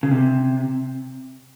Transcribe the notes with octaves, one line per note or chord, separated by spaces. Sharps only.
C#3
C3